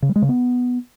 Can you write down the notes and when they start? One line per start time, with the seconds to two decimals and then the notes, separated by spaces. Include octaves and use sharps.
0.02 C#3
0.09 G3
0.16 G#3
0.22 C#3
0.29 B3